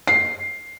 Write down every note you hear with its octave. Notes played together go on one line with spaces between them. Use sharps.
C7